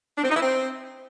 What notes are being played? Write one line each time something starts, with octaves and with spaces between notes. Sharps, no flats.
D4
C4
D#4
E4
C4